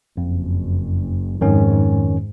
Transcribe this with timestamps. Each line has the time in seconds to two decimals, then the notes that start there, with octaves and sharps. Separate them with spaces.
0.17 F#1 F2
1.40 F2 G#2 D#3 C#4